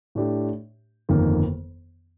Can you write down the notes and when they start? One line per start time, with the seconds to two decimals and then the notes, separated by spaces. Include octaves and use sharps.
0.15 A2 A3 D4 G4
1.09 G1 F2 D#3 A#3